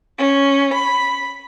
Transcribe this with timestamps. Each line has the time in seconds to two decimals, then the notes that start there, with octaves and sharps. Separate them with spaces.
0.18 C#4
0.74 B5